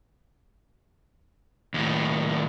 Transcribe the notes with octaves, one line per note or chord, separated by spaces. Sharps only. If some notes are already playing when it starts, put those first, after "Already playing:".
D#2 A2